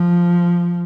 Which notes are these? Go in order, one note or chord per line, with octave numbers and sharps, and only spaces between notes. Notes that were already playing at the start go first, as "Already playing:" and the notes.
Already playing: F3